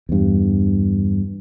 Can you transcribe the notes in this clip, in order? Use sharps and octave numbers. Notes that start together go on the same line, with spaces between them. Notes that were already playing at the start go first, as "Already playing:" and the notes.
E2 G2